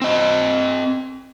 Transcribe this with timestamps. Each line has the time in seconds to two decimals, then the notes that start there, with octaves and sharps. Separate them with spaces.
0.02 C4 D#5